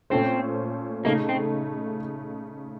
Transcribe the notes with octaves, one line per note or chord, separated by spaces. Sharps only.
A#2 A3 C4 C#4 A4 C5
C#3 A3 A#3 D#4
C4